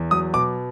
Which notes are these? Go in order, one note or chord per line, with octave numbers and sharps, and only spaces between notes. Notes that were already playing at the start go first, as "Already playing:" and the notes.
Already playing: E2
F#3 D#6
B2 D6